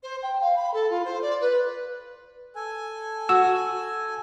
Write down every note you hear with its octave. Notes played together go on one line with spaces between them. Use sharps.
C5
G5
F5
B5
A4
F4
C5
D5
B4
A4 G#5
F#4 E6